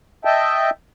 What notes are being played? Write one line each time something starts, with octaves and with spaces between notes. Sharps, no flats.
D#5 E5 G5 A5